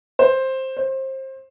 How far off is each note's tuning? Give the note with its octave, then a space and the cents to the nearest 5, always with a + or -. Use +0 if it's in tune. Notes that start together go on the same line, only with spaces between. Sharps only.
C5 +10
C5 +25